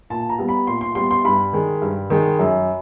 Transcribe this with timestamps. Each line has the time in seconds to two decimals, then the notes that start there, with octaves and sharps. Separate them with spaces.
0.10 A#2 A5
0.29 A#5
0.39 G3 B3
0.48 B5
0.67 A#2 C6
0.81 C6
0.95 G3 B3 C6
1.11 C6
1.24 G2 B5
1.53 D#3 G#3
1.82 G2
2.10 D#3 G#3
2.39 F#2